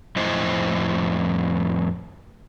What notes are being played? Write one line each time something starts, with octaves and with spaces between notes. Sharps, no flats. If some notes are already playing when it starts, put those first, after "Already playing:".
F2 A2 E4 C5 D#5